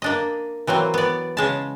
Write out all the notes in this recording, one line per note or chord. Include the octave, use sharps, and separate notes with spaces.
A#3 D4 D#5
E3 F#3 A#3 C4
B3 D5
C#3 G#3 A5